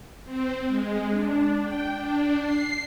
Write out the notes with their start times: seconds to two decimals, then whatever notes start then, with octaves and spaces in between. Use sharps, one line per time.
0.24 C4
0.67 G#3
1.10 D4
1.61 G5
1.94 D4
2.39 C7